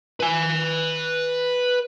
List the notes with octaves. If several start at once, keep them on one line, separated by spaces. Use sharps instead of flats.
B4 G#5